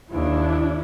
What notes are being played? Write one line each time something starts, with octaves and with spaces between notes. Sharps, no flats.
D#2 D4 E4